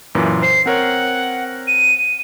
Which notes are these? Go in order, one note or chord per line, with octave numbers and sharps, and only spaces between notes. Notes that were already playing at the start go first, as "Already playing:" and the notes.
F#2 A#2 E3
C5 C7
C4 A#4 C#5 F#5
D#7